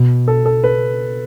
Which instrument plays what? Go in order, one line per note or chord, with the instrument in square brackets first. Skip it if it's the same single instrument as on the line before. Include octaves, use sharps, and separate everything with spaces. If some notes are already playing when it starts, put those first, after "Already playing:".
Already playing: [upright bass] B2
[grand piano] A4
A4
B4